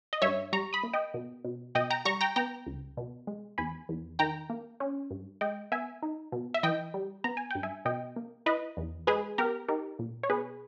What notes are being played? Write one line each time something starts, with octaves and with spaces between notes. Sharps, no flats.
D#5
G2 C#5 E5
G3 A#5 C#6
B5 D#6
A#3
D#5 G5
B2
B2
B2 D#5 G5
G5 A#5
G3 A#5 C#6
G5 A#5
B3 G5 A#5
C#2
B2
G#3
E2 G#5 B5
E2
D#3 G5 A#5
A#3
C#4
G2
G#3 D#5 G5
B3 E5 G#5
D#4
B2
E5
E3 D#5 G5
G3
B3 A#5
G#5
G2 G5
E5 G#5
B2 D#5 G5
A#3
E4 B4 D#5
E2
G#3 G#4 B4
B3 G4 A#4
D#4 G4 A#4
A#2
C#5
B2 G#4 B4